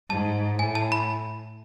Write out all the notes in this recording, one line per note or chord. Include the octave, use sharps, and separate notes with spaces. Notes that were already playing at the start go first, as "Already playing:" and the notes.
G#2 A5
A2 G#5
A5
B5